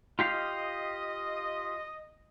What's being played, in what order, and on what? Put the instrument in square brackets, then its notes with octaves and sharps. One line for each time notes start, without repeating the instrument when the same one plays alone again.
[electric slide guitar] F4 G4 F5 [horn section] D#5